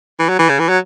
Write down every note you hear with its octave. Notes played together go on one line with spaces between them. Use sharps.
E3
F#3
E3
C#3
E3
F#3